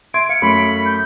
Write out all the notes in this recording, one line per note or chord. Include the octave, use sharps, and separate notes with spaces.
E5 C6 G#6 D7
F5 C#7
F#2 A3 B5
G6